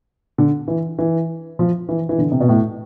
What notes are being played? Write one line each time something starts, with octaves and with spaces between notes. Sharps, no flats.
D3
E3
E3
F3
E3
E3
D3
C3
B2
A2